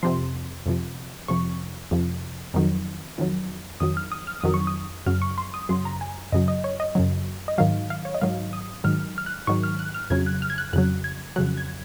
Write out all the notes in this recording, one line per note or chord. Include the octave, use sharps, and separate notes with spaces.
F2 C3 F3 C6
F2 C3 F3
F2 C3 F3 C#6
F2 C3 F3
F2 D#3 F#3
F2 D#3 F#3
F2 D#3 F#3 D#6
F6
D#6
F6
F2 D#3 F#3 D#6
C#6
D#6
F#2 C#3 F#3 F6
C#6
C6
D#6
F#2 C#3 F#3 C6
A#5
G#5
F#2 C#3 F#3 D#5
D#5
C#5
D#5
F#2 C#3 F#3
D#5
G#2 D#3 F#3 F5
F5
C#5
D#5
G#2 D#3 F#3 F5
D#6
G#2 D#3 F#3 F6
F6
F#6
G#2 D#3 F#3 C#6
F6
F#6
F6
F2 C#3 F#3 G#6
F#6
F6
G#6
F#6
F2 C#3 F#3 F#6
G#6
F2 C#3 F#3 F#6
G#6